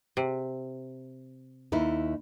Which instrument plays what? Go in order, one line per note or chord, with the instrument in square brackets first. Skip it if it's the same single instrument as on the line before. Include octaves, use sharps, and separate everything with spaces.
[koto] C3
[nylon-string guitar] D#2 D#4 E4